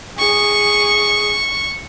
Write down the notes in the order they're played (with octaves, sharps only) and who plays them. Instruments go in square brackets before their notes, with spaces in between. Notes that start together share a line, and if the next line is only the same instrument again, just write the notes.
[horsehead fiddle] G#4 [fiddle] C#6